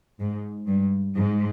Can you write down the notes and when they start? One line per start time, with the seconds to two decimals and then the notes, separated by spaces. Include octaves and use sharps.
0.20 G#2
0.68 G2
1.16 G#2